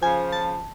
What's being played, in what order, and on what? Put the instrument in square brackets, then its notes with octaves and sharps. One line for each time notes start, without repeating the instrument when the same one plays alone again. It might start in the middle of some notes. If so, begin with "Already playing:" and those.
[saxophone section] C#3 F3 [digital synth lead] G#5
[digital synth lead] A5